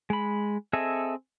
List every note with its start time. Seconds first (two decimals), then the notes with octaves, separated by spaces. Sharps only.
0.10 G#3 B5
0.73 C4 G#4 A4 D#5 E5